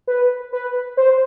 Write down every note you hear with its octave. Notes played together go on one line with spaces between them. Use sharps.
B4
B4
C5